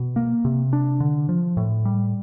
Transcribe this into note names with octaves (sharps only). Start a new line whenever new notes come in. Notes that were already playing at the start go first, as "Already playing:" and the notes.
Already playing: B2
A#3
C3
D4
D3
F3
A2
G3